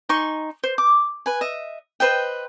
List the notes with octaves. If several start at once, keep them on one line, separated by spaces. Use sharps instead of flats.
D#4 G#5 C6 C#6
C5
D6
B4 G#5
D#5 E5
B4 C5 D#5 G5